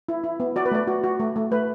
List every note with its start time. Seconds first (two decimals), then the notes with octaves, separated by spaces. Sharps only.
0.09 E4
0.24 E4
0.40 B3
0.56 F#4 D5
0.66 B4
0.72 A3 D5
0.87 F#4
1.04 F#4
1.20 A3
1.36 A3
1.52 A3 B4